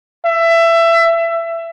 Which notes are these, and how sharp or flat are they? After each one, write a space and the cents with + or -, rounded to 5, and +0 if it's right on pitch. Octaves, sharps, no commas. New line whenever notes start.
E5 +20